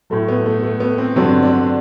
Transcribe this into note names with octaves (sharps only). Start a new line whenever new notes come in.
A2 F#3 A3
B3
A3
A3
B3
C4
G2 D3 F#3 C4
D4